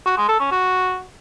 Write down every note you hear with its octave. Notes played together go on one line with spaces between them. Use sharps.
F#4
G#3
A4
C#4
F#4